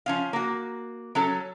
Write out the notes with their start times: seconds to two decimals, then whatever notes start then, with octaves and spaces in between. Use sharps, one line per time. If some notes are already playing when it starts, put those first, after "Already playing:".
0.06 F3 C#4 F5
0.33 A#3 F#4
1.15 F#3 C#4 A4